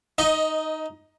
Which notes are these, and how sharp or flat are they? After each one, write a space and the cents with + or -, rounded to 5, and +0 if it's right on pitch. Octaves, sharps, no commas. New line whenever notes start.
D#4 +0 D#5 +20